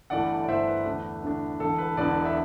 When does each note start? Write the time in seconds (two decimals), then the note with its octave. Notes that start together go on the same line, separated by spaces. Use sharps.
0.10 G1 G2 E3 A3 D5 F#5
0.44 D5
0.48 G1 G2 E3 A3 C5 E5
0.67 B4
0.85 E2 D3 A3 D4
1.23 E2 D3 A3 D4
1.60 E1 E2 D3 A4
1.78 B4
1.97 E1 E2 D3 B4 D5
2.25 E5